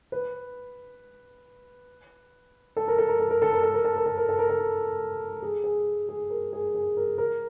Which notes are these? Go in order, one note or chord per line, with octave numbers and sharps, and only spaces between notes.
B4
A4
A#4
A4
A#4
A4
A#4
A4
A#4
A4
A#4
A4
A#4
A4
A#4
A4
A#4
A4
G#4
G#4
G#4
A#4
G#4
G#4
A#4
A#4